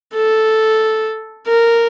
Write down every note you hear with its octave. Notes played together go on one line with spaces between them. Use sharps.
A4
A#4